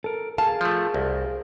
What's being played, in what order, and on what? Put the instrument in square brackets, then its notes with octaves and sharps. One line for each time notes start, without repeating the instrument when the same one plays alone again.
[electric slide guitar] A4 A#4
[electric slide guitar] G#4 A#4 F5 [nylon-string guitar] A5
[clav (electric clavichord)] F3 A3
C2